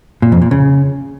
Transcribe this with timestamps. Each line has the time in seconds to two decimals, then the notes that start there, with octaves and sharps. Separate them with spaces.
0.22 A#2
0.32 F2
0.42 A#2
0.51 C#3